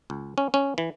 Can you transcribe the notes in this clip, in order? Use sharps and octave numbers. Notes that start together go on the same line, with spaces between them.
C#2
C#4
C#4
E3